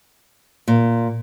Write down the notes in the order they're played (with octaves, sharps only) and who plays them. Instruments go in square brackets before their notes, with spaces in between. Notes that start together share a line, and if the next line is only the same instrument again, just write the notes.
[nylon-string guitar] A#2